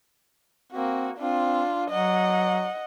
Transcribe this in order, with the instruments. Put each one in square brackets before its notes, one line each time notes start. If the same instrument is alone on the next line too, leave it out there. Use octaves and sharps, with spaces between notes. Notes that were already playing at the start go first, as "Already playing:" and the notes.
[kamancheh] A#3 F#4 [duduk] C4
[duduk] C4 [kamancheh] D4 F4
[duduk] F#3 [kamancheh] D#5 F#5